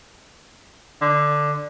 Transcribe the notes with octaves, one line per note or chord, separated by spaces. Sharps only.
D3